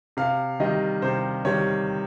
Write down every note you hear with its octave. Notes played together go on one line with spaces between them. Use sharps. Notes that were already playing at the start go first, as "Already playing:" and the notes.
C3 F5
D#3 G3 D#5
C3 C5
D#3 G3 C#5